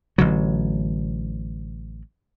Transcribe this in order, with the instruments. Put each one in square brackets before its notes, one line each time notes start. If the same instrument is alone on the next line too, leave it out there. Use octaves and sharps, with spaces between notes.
[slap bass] A1 D3 F#3